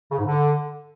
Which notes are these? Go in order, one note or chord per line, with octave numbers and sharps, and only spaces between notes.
C#3
G#2
D3